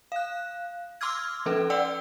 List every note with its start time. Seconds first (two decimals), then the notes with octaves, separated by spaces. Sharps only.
0.12 F5 F#6
1.01 C6 D6 E6 F6 G#6
1.46 F3 C#4 A4 B4
1.70 D5 F#5 G5 E6